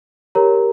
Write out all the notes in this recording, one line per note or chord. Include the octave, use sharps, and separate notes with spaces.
G4 A#4 C#5 A#5